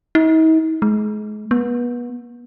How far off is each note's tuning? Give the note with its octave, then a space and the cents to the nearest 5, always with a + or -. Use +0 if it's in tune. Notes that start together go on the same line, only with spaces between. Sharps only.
D#4 +45
G#3 +35
B3 -30